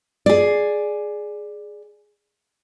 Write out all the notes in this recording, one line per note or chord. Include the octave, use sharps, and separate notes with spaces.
G#4 D5